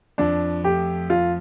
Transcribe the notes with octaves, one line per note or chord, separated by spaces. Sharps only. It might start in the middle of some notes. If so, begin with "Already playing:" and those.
F2 D4
F3 A3 G4
F2 F4